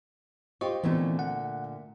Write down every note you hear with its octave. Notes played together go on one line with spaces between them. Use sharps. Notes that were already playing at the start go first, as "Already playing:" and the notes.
F4 G4 C5 D#5 C#6
A#2 D3 E3 A3 B3 C4
F#5